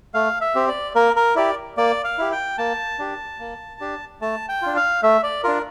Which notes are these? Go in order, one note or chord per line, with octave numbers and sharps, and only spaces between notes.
A3 F5
E5
C4 G4
D5
A#3 A#4
A#4
E4 G4 D5
A#3 D5
F5
E4 G4
G5
A#3 A5
D4 G4
A#3
D4 G4
A3 A5
G5
D4 F4
F5
A3 E5
D5
D4 F4 A#4